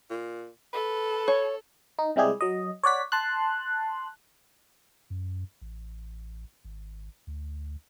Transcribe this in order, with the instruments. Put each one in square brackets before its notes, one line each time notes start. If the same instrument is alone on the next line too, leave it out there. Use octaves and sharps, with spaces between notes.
[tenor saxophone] A#2
[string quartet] A4 [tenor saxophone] B4
[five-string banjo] C#5
[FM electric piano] D#4
C3 G3 G#3 E4 G4 G#4
F#3 D#5
C#5 D5 F#5 B6
A5 C6 F#6
[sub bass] F#2
A1
G#1
D2